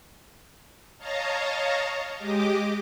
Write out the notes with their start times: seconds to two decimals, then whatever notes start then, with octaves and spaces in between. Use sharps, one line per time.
0.98 C#5 D#5 F5 A5 A#5
2.17 G#3 G4 D#5 D6